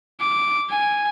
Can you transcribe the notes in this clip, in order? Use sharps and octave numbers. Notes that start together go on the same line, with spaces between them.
D6
G#5